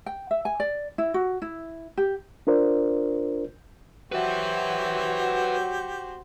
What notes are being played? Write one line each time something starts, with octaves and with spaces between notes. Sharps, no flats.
G5
E5
G#5
D5
E4
F#4
E4
G4
D4 F4 A#4 C5 D5
F#3 F#4 G4 B4 C5 E5